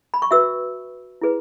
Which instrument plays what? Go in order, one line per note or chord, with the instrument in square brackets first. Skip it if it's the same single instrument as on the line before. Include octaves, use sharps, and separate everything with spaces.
[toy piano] B5
C#6
F#4 B4 E5 E6
E4 G#4 B4